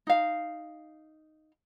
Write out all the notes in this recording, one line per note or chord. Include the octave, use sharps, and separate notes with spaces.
D#4 F5